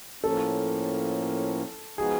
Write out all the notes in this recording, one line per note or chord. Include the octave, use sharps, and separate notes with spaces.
A2 F3 A#3 C#4 A4
F3 G#3 B3 D#4 F#4 G#4